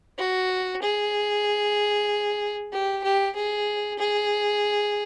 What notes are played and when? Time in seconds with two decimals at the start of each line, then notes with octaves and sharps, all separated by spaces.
0.18 F#4
0.82 G#4
2.73 G4
3.04 G4
3.36 G#4
3.99 G#4